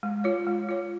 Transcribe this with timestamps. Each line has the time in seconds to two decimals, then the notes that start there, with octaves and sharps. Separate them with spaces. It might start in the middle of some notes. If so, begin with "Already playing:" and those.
0.03 G#3
0.24 F4 C#5
0.47 G#3
0.69 F4 C#5